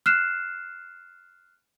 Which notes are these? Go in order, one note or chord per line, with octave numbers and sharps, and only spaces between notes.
F6 F#6 C7 E7